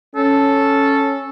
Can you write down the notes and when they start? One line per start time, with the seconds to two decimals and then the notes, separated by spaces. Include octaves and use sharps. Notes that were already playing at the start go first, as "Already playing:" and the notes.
0.15 C#4 A4